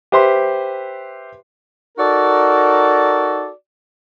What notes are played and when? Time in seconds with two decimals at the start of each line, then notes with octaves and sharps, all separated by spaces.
0.12 G4 B4 C5 E5 C6
1.98 D#4 F#4 A4 A#4 D5